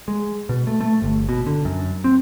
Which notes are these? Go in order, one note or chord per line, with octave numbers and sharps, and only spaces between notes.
G#3
B2
A3
A3
G1
B2
D3
F#2
C4